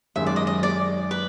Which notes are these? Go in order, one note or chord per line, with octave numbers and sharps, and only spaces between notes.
F#2 D#3 G#3 E5
D5
D#5
D#5
D5
B4